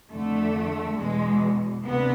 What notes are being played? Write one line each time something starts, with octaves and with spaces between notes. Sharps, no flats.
F2 D3 A3
E2 B2 G#3
D2 C3 B3